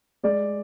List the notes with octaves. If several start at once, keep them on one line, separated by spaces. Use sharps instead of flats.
G#3 D5